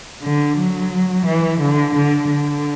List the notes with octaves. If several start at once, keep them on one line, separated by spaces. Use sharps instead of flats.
D3
F#3
E3
D3
D3
D3